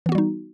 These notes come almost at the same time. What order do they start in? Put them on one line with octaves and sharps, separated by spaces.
E3 B3 F#4 G3 D#4